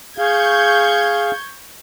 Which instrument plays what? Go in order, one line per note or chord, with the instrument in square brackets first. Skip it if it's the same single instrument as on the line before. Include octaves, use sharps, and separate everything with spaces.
[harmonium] G#4 F5 [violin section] C#6 G6 G#6